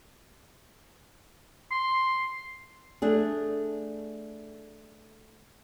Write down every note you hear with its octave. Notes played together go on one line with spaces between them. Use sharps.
C6
A3 D4 G#4